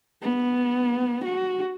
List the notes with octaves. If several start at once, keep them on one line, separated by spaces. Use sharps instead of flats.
B3
F#4